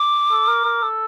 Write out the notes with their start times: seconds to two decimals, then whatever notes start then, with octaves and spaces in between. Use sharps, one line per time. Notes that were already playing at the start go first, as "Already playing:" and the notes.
Already playing: D6
0.31 A4
0.47 A#4
0.65 A#4
0.82 A4